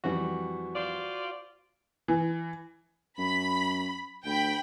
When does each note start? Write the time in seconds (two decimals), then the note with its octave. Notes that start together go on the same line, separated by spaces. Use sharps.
0.04 F2 E3 G3 F#4
0.75 F4 C5 D5
2.08 E3
3.18 F#2 B5
4.25 D2 G5 B5